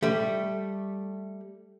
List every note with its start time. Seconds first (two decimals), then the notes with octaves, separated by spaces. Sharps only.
0.03 G3 A3